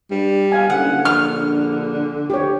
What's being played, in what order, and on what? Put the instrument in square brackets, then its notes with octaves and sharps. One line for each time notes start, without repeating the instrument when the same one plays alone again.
[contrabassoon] G2 [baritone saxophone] G3
[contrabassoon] B2 [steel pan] F5 G#5
[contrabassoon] F#1 [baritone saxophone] D3 [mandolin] F#5
[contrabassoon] A#1 [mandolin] F6
[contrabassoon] D2 [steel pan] G4 C#5